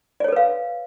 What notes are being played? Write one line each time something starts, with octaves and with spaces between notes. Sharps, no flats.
A4 B4 C#5 D5 F5